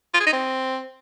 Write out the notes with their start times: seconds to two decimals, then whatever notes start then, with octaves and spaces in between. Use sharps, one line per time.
0.14 F4
0.20 G#4
0.26 D#4
0.32 C4